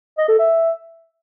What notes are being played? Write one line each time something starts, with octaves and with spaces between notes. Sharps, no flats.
D#5
A4
E5